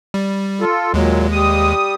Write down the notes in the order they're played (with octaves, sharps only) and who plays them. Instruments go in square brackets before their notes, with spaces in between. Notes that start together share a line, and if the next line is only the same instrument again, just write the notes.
[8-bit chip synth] G3
[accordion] F4 A4
[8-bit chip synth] D#2 G#3 [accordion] A#2 F#3
[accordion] G3 D#6